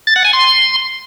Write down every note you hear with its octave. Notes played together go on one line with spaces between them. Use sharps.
A6
F#5
G#5
C6